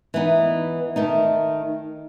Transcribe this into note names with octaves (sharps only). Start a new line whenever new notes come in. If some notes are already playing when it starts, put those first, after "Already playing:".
E3 B3 D#4
D#3 A3 D#4